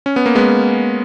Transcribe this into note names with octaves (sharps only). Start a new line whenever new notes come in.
C#4
B3
A#3
G#3 B3